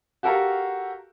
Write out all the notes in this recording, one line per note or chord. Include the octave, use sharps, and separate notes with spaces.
F#4 G4 A4 A#4 F5